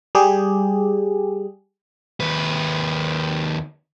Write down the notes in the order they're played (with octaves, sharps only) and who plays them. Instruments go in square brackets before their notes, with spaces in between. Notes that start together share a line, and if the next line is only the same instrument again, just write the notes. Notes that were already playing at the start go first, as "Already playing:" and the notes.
[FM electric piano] G3 G4 G#4
[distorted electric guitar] D#2 B4